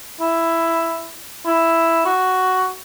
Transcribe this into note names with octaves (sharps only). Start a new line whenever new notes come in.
E4
E4
F#4